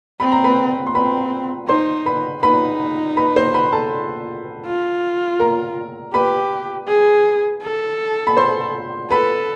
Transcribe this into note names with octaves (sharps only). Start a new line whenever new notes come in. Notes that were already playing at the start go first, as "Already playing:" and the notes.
C4 B5
A#5
B4 B5
C6
C4 B4 B5
D#4 C5 C6
B4 B5
D#4 B4 B5
B4 B5
C5 C6
B4 B5
A4 A5
F4
A#4 A#5
G4 B4 B5
G#4
A4
B5
C5 C6
A4 B4 B5